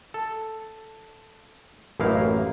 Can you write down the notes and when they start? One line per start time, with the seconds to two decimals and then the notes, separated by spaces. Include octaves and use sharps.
0.14 A4
2.00 A1 F#2 A#3 D#4 E4 F5